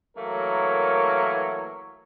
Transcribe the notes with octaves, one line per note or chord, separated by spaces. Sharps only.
E3 F#3 A3 A#3 A#4 C#5